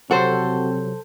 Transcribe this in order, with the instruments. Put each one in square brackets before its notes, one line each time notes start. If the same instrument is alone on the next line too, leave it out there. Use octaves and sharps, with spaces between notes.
[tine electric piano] C3 F#3 [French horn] C4 [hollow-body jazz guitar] F#4 [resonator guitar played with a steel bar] A4 C5